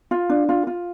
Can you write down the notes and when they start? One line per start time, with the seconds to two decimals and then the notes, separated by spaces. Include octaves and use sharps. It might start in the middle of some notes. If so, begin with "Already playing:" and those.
0.11 F4
0.30 D4
0.49 F4
0.67 F4